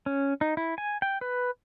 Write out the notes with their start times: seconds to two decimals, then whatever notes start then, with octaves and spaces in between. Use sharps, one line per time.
0.06 C#4
0.41 D#4
0.57 E4
0.78 G#5
1.02 G5
1.21 B4